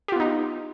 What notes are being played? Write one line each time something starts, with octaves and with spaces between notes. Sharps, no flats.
B3 D#4 F4 G4